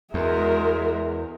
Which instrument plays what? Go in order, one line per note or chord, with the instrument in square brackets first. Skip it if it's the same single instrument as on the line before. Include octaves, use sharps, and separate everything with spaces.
[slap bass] E2 [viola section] G#3 A#4 [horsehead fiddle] F#4 E5